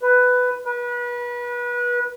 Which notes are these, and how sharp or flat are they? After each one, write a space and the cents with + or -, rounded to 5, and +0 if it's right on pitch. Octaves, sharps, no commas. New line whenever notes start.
B4 +10
B4 -30